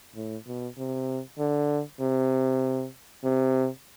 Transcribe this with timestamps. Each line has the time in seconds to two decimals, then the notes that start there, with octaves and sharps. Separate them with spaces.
0.15 A2
0.46 B2
0.78 C3
1.38 D3
2.01 C3
3.24 C3